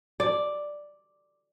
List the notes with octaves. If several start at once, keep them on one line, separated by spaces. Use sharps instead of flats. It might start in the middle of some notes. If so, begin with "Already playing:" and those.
D5